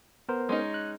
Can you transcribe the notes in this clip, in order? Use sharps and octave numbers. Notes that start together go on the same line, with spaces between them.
B3 A#4 C5
G#3 C#4 D#4
F#6